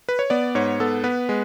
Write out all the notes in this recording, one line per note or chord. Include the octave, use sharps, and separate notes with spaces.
B4
C#5
B3 D5
G#2 C#5
B3 A4
B3 B4
G#3